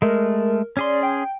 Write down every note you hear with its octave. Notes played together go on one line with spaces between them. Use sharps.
G#3 A3 A#4
C#4 G#4 D5 C6
G5